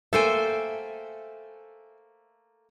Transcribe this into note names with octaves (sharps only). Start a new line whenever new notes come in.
A3 A#3 A4 C5 E5 G5 G#5